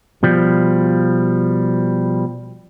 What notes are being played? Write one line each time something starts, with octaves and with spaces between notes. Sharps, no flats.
B2 F3 G3